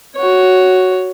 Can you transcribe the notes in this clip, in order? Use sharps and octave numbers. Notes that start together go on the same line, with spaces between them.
F#4 C#5